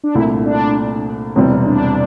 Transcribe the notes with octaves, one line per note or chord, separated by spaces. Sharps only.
D4
C2 A#2 A3 E4
D4
E1 E2 C3 G3 C4
D4